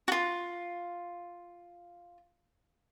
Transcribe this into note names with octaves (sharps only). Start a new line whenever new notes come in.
F4 F#4